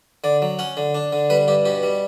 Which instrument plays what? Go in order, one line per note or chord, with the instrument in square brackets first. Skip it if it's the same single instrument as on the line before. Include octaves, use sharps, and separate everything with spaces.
[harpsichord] D3 D5
F#3
C#4 F#5
D3
D4
D3
G3 B4
G2 G4
B2 G4
G3